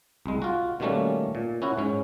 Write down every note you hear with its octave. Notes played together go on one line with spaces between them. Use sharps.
C2 G#3
F4 F#4
B2 D#3 G3 A3 A#3 C#4
A#2
C#4 E4 F#4
G#2 C#4